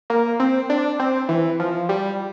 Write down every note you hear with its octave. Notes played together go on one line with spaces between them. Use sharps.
A#3
C4
D4
C4
E3
F3
G3